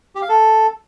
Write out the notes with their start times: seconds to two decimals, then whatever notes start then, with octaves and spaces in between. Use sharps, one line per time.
0.15 G4
0.22 F5
0.29 A4